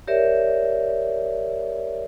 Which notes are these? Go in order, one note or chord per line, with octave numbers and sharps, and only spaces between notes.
G4 A#4 C#5 D5 E5